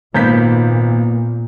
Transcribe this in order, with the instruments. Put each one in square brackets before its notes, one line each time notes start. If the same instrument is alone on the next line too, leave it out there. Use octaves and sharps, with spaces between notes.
[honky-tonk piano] G#1 G6 B6 [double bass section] A#2 [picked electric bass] A#3 B3